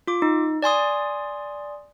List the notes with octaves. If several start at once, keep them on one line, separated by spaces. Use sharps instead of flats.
F4 D6
D#4
D5 G#5 C6 D#6